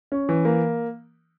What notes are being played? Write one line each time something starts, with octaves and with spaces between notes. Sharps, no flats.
C#4
E3
A#3